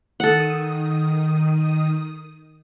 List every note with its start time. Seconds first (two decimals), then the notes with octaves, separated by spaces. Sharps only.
0.20 D#3 A4 F#5 D#6